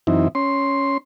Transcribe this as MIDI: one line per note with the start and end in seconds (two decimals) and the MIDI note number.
0.07 0.28 42
0.07 0.28 52
0.07 0.28 60
0.07 0.28 63
0.07 0.28 64
0.35 0.98 61
0.35 0.98 84